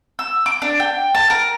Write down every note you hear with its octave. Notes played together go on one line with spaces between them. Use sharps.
E6
D6
D4
G5
A5
A#4